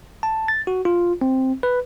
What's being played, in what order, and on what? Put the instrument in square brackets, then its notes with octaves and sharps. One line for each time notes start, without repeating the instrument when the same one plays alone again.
[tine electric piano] A5
A6
F#4
F4
C4
B4